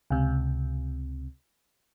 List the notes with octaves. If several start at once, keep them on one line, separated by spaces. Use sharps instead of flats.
C#2 C3